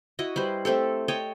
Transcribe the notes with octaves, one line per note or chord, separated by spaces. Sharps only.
E4 F#4 D#5
G3 B4 C5
A3 C4 G4 A4
C#5 D#5 G5 A5